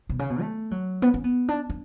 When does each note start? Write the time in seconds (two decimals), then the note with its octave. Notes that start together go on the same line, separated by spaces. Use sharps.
0.09 B2
0.19 C#3
0.30 B2
0.41 A3
0.71 F#3
1.02 B3
1.14 C#4
1.24 B3
1.48 D4
1.70 D4